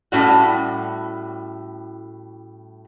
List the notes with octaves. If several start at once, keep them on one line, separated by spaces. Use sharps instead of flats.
A2 G3 C#4 F#4